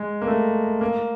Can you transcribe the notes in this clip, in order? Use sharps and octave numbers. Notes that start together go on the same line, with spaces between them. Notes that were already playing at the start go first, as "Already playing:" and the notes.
Already playing: G#3
A#3
A3
A#3